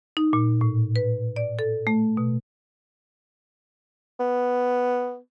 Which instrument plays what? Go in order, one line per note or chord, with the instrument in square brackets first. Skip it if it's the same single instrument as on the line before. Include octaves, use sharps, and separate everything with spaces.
[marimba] D#4
A#2
A2
B4
D5
A4
A3
B2
[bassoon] B3